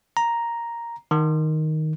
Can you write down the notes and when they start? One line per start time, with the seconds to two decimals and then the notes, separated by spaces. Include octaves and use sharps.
0.17 A#5
1.11 D#3